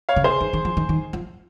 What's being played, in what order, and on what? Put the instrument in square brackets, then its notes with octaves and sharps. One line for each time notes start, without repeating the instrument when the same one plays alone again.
[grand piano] C#5 F5
[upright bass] C#3
[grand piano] G#4 C5
[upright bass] D#3
D#3
F3
D#3
D#3
F3